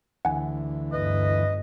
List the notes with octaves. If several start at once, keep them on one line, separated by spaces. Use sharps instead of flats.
D2 E3 F#5 G#5
G1 B4 D#5